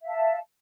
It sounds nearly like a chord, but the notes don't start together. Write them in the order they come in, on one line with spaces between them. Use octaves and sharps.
E5 F5 A5